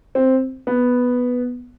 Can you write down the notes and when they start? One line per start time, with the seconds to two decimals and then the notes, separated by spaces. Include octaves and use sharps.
0.15 C4
0.67 B3